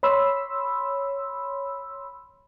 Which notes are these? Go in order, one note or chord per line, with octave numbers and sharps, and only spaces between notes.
C#5 B5 C6 E6